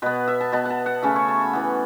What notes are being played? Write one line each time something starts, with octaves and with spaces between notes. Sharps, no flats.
B2 B3 B4
E5
A5
B2 B3 A5
F#5 A5
F#5
C#3 A3 C#4 E5
C#5
A5
B5
E3 B3